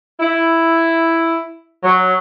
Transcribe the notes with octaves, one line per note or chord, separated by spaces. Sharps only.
E4
F#3